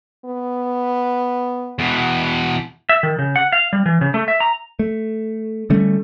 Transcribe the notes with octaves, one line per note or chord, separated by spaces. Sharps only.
B3
E2 B2
E5
D#3
C#3
F#5
F5
G3
E3
C#3
A3
E5
A#5
A3
D3 G3 A3 C#4